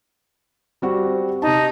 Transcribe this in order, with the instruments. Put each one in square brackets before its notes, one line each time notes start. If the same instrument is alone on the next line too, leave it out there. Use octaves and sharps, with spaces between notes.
[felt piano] G3 C4 F#4
[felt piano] C3 A5 [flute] D#4